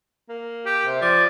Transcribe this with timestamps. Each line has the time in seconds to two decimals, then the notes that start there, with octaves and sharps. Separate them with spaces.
0.29 A#3
0.66 G4
0.85 C3
1.01 F3 D5